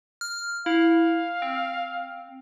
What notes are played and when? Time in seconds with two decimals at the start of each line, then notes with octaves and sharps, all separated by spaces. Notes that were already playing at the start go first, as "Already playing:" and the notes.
0.21 F6
0.66 E4 F5
1.42 C4